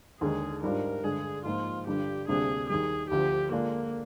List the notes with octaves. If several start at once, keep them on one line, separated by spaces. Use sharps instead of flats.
D#2 D3 G#3 D#4 G#4
G#2 G3 D4 F4 A#4
G2 D3 G#3 D4 G#4
G#2 F3 A#3 F4
G2 D3 G3 D4 F4 G4
D2 C3 G3 A#3 D4 G#4
D#2 D#3 G3 G#4
D2 D3 F3 G4
D3 G#3 A#3 D4 F4